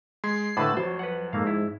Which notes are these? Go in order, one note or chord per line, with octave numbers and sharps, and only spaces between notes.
G#3 C6 G#6 C7
A2 D3 A3 B4 A5 B5 D6
F2 F#3 C5
B4 F#5
G#2 A3 A#3 F5
E4